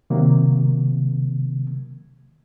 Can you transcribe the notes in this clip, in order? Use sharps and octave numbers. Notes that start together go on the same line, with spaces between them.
C3 D#3 F#3 A#3